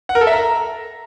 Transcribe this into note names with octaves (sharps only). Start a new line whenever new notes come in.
F#5
A#4
A4
E5
A#5